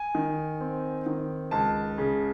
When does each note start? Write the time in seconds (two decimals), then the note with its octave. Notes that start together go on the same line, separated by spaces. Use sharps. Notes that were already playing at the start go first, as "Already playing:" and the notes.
Already playing: G#5
0.15 D#3
0.60 C4
1.06 D#3
1.51 C#2 A5
1.98 C#3